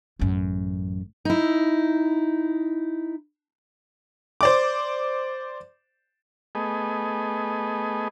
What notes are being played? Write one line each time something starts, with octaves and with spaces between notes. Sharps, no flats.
A1 F#2
D#4 E4
C5 D5 D6
A3 B3 G#4 D#5